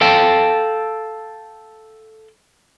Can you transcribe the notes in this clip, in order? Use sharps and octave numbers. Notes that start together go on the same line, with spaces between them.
A4 F5 G5 A5